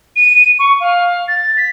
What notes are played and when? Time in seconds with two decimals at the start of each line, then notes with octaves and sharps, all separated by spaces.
0.16 D#7
0.59 C#6
0.80 F5
1.28 A6
1.56 B6